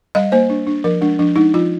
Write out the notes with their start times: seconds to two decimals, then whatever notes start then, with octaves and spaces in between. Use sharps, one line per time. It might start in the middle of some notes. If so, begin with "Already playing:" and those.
0.15 G3 D#5
0.32 A#3 C5
0.50 D4
0.67 D4
0.84 F3 A#4
1.01 G#3 D4
1.19 F3 D4
1.36 G#3 D#4
1.54 F3 F4